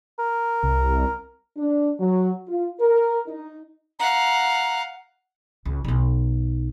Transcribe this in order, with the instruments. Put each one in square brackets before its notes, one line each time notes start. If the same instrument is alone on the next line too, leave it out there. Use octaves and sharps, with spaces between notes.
[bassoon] A#4
[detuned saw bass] C2
[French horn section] D4
F#3
F4
A#4
D#4
[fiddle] F5 F#5 [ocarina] A#5
[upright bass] C#2
B1 D#4